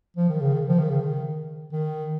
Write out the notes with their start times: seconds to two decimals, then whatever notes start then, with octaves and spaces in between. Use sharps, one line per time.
0.17 F3
0.30 D#3
0.41 C#3
0.54 D#3
0.68 F3
0.79 D#3
0.90 C#3
1.01 D#3
1.72 D#3